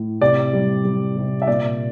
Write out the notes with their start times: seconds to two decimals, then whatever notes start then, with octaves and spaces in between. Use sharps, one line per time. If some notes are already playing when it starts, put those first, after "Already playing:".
Already playing: A2
0.21 C3 D5
0.53 G3
0.85 G3
1.17 C3
1.42 E5
1.47 A#2 D5